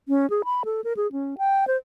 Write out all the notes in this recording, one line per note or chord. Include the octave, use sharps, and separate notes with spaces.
C#4
G#4
B5
A4
A#4
G#4
C#4
G5
C5